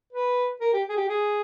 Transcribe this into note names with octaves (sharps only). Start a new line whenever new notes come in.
B4
A#4
G4
G#4
G4
G#4